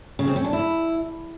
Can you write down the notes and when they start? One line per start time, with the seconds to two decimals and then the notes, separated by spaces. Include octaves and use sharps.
0.19 C#3
0.27 C4
0.36 C#4
0.44 D4
0.53 E4